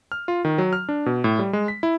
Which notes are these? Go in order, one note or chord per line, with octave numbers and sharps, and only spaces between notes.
F6
F4
D#3
F#3
F6
D4
B2
A2
G3
G#3
B6
E4